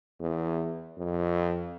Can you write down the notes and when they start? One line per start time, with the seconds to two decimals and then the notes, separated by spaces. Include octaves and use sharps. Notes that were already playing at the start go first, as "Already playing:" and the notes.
0.20 E2
0.97 F2